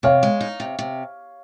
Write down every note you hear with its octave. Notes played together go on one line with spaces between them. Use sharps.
C3 C#5 F5
G#3
D#4
C3
C3